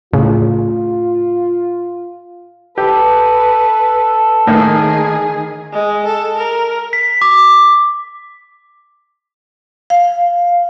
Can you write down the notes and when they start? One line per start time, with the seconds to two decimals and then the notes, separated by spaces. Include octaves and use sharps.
0.13 A2 C#3 F4
2.78 G4 A4 B4
4.47 A2 D#3 A#3 D#4 G#4
5.72 G#3
6.06 A4
6.37 A#4
6.93 B6
7.22 D6
9.90 F5